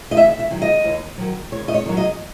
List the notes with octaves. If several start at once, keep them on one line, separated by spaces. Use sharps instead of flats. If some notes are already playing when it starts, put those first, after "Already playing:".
D#5
D#2 E5
E5
D#3 F#3
D#5
D#2
D#3 F#3
D#2 C#5
D#5
C#5
D#3 F#3
D#5